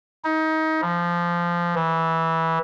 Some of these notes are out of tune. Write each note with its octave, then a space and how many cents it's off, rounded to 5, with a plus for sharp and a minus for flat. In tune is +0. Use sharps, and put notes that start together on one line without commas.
D#4 +25
F3 -15
E3 -15